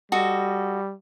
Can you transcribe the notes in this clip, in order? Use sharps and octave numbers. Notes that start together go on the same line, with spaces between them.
G3 F#4 A4 D#5